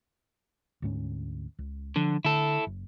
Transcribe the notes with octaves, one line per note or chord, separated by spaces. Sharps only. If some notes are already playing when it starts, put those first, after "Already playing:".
D2 G#2 C#4
C#2
D3 F3
D3 E4 A4
F#1